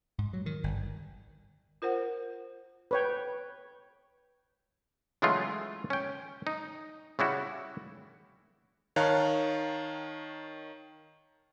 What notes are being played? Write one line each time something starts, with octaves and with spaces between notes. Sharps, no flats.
G#2
F#3
D#3
G1
F4 A#4 C5 F#5
B4 C#5 G5
C#3 E3 F#3 G#3 A3 F4
C#4 G5
D#4
C#3 G3 E4 F#4
D#3 C#5 F5 A5 A#5 F#6